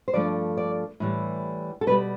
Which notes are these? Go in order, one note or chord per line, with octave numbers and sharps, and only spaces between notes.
C5
G2 F3 A3 D5
D5
A2 E3 G3
A4
B2 G3 B4